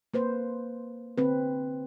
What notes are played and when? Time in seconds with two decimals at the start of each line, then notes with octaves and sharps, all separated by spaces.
0.14 A#3 B4 C5
1.18 D3 C4 B4